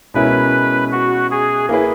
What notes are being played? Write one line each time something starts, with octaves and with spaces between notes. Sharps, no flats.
B2 G#3 C#4 E4 A#4 B4
F#4
G#4
A#3 E4 G#4 B4